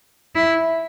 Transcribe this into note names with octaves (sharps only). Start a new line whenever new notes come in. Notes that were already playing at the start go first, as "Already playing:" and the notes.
E4